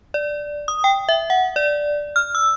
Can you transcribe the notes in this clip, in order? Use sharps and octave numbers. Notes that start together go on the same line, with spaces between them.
D5
D#6
G5
E5
F#5
D5
F6
E6